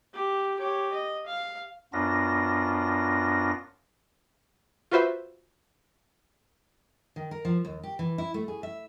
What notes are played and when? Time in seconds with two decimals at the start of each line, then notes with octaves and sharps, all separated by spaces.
0.14 G4
0.59 G4 C#5
0.92 D#5
1.27 F5
1.93 F#2 B3 D4 F4 A#6
4.91 F4 F#4 B4 C5 E5
7.16 D#3
7.31 A#4
7.45 F3
7.65 D#2
7.83 G4
7.99 E3
8.18 E4
8.34 A3
8.48 G#4
8.63 E5